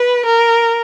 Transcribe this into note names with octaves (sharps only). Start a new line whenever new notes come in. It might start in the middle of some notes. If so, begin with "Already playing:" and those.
Already playing: B4
A#4